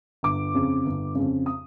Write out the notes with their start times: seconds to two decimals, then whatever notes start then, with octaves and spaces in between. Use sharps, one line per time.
0.23 G1 D6
0.55 F2 C#3
0.85 G1
1.15 F2 C#3
1.46 D#6